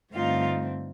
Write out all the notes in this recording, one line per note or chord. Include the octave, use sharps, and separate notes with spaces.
G2 D3 A3 C4 D#4 F4 F5